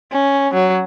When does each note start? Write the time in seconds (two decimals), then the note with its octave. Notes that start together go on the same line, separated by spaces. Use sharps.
0.12 C#4
0.54 F#3